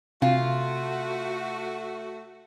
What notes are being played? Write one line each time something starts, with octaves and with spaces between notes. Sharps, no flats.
C3 A3 F4 F#4